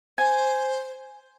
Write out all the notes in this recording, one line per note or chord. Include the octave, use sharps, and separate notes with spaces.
C5 G#5